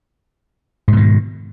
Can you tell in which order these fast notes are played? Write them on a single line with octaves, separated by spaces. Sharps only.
G#2 B2 D#3